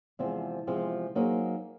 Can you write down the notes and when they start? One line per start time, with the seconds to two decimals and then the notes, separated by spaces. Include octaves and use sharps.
0.19 E2 C3 F3 G#3 C4
0.67 E2 C3 F3 G#3 C4
1.15 F#3 A#3 D#4 G#4 C5